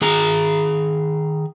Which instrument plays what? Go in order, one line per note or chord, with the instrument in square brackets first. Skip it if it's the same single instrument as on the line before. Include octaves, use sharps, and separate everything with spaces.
[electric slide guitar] D#3 G#4 A#5